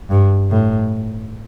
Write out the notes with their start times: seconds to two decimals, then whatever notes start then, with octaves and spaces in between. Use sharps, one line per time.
0.10 G2
0.50 A2